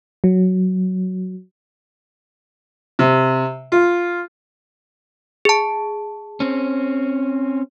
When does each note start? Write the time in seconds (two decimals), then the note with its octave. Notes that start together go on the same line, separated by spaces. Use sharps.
0.24 F#3
2.99 C3
3.72 F4
5.45 G#4 A5
6.40 C4 C#4